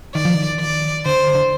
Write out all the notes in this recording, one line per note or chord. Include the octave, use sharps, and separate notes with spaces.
D#3 D5
F3
D#3
D5
D3 C5
D3